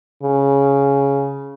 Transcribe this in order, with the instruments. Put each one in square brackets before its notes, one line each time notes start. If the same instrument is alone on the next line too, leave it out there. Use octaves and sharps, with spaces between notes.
[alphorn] C#3